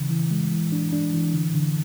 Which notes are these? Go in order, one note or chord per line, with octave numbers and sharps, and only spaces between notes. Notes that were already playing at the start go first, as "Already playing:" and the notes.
Already playing: C#3 E3
E3
G#3
E3
D4
D4
E3
D3
D3